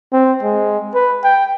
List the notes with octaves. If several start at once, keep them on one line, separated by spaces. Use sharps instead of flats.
C4
G#3
B4
G5